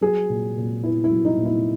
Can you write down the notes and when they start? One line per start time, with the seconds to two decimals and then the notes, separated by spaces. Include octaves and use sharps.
0.01 F#3 G#4
0.30 A#2
0.57 A#2
0.84 B3 E4
1.04 E4
1.11 F#3
1.25 D#4
1.38 A#2
1.45 E4